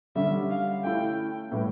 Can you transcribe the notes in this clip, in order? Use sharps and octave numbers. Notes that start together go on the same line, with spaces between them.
D3 G3 C#4 E5
F5
A3 C#4 E4 G5
A2 E3 G3